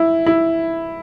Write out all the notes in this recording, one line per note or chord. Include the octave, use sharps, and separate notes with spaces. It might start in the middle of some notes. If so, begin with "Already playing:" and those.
Already playing: E4
E4